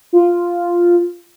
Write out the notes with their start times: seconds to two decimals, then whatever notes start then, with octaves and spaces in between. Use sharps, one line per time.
0.13 F4